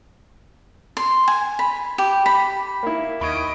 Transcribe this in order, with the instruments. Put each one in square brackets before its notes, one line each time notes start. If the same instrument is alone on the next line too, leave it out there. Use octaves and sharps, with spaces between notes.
[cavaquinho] C6
G#5
B5
G4
B5
[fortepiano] A#3 E4
[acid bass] D#2 [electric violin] D#5 D7 [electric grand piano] B5 C#6 G#6